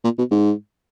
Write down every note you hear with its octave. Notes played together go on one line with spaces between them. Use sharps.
A#2
B2
G#2